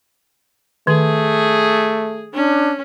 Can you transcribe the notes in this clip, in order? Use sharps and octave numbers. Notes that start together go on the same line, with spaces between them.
D#3 A3 G#4
C#4 D4